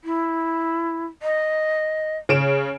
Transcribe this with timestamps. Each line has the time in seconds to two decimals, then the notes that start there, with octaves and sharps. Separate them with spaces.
0.04 E4
1.22 D#5
2.29 C#3 D7 E7